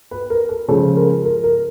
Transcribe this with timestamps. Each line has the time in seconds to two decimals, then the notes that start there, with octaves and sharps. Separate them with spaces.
0.11 B4
0.30 A#4
0.49 A4
0.68 C#3 F3 G#3 A4
0.96 A#4
1.25 A#4
1.44 A#4